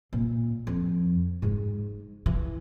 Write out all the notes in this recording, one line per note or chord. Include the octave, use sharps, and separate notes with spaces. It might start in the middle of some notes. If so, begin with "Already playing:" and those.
A#2
F2
G#2 G#3
E3